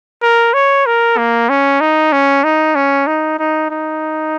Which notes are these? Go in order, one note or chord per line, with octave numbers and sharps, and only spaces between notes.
A#4
C#5
A#4
A#3
C#4
D#4
C#4
D#4
C#4
D#4
D#4
D#4